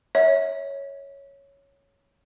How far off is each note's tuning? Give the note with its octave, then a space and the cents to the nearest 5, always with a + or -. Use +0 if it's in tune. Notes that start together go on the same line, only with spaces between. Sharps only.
C#5 +0 E5 -30